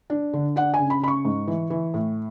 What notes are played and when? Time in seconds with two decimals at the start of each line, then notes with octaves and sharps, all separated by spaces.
0.10 D4
0.33 D3
0.56 D4 F#5
0.74 C#3 G#5
0.90 B5
1.02 C#3 B5
1.08 C#6
1.25 G#2
1.47 E3
1.70 E3
1.94 A2